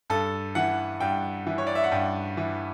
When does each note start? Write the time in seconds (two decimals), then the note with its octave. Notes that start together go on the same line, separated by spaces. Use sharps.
0.10 G2 A4
0.55 E3 F#5
1.01 G2 G5
1.47 E3
1.58 C#5
1.67 D5
1.75 E5
1.84 F#5
1.92 G2 G5
2.37 E3